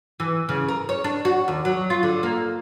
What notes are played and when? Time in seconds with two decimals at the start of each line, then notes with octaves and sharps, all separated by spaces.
0.20 E3
0.49 C#3
0.68 A#4
0.89 C#5
1.04 D4
1.25 F#4
1.48 D#2
1.65 F#3
1.90 F4
2.03 D3
2.23 A#3